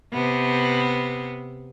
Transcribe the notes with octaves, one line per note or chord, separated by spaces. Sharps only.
C3 B3